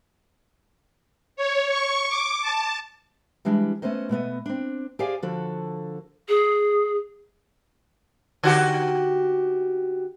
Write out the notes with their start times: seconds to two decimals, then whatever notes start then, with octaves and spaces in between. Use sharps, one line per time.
1.36 C#5
1.69 C#6
2.09 D6
2.42 A5
3.45 E3 G3 G#3 D4
3.82 A3 B3 C#4 C5 D#5
4.09 B2 A3 B3 D#5
4.46 C4 D4
4.99 G4 G#4 C5 D5 F5 G#5
5.23 D3 F3 F#4 A4
6.28 G#4
8.43 D3 F#4 G4